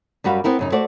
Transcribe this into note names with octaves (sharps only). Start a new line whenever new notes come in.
F#2 G3 F#4 B4 F5
B3 C4 E4 A#4
F#2 C#3 D#4
A3 F#4 C5 D5